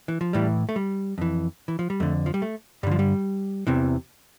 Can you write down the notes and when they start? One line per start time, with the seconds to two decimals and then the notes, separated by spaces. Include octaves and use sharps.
0.08 E3
0.21 F3
0.33 A2 E3 G3
0.69 A3
0.76 G3
1.18 F2 E3
1.68 E3
1.79 F3
1.90 G3
2.00 F2 D3 A3
2.26 F3
2.34 G3
2.42 A3
2.83 G2 G3
2.87 D3 F3
2.99 G3
3.67 E2 C3 E3